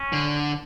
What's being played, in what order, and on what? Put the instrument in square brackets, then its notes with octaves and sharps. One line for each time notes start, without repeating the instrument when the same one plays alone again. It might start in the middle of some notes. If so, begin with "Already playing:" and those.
Already playing: [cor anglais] C#4
[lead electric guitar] D3